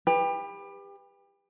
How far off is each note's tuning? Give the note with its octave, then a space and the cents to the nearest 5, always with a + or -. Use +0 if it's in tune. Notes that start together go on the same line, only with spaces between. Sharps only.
G4 +30 B4 +0